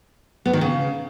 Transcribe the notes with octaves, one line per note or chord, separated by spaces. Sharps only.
B3
D#3
C#3